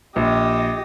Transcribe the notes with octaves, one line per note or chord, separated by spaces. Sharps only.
A#1 G4 D#5